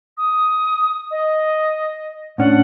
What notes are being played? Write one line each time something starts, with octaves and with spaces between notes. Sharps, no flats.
D#6
D#5
A2 C#4 D4 F#5